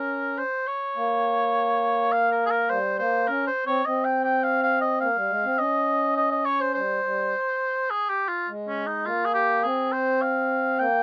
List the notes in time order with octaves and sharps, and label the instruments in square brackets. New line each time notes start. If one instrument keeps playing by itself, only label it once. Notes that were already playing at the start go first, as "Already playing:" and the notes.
Already playing: [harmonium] C#4 [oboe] A#4
[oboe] C5
C#5
[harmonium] A#3
[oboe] F5
A#4
G#4
A#4
[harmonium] G3 [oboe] C5
[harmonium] A#3 [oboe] C5
[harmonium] C#4 [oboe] A#4
[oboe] C5
[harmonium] C4 [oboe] C#5
[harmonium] C4 [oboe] D#5
[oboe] G5
G5
F5
F5
D#5
[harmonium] A#3 [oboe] F5
[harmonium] G3
G#3
C4
[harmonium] C#4 [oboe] D#5
[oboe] D#5
D#5
C#5
C5
[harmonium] G3 [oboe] C5
[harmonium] G3
[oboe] G#4
G4
F4
[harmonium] G#3
[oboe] C#4
D#4
[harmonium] A#3 [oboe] F4
[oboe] G#4
G4
[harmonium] C4 [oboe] G#4
[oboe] C5
F5
[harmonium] A#3 [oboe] G5